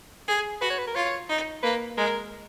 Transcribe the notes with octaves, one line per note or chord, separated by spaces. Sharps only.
G#4
F#4 B4
C#5
B4
A#4
F4 C#5
D#4
A#3 B4
G#3 A#4